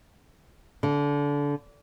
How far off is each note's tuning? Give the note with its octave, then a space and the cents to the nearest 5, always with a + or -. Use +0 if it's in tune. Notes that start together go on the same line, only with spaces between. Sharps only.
D3 -25